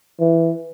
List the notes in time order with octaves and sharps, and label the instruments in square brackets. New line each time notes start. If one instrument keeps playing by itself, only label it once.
[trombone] E3